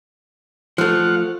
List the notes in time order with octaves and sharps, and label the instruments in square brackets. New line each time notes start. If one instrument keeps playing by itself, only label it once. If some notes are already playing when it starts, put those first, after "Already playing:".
[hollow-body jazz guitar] F3 A3 [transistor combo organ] F5 F#5